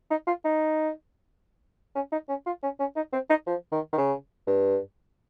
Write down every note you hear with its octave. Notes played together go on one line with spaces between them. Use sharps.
D#4
F4
D#4
C#4
D#4
C#4
F4
C#4
C#4
D#4
C4
D#4
F3
D#3
D#3
C#3
G2